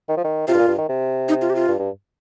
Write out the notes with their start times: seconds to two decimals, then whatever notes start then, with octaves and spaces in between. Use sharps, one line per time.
0.09 D#3
0.17 F3
0.25 D#3
0.48 C3 F4
0.54 G2
0.59 A#2
0.68 G2
0.78 D#3
0.89 C3
1.29 D#4
1.42 F4
1.50 G4
1.55 F4
1.68 G2
1.79 G2